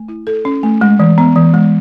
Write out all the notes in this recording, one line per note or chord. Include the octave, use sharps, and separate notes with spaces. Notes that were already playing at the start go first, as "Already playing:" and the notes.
Already playing: A3
E4
A4
C#4
A3
G#3
E3
B3
E3
G#3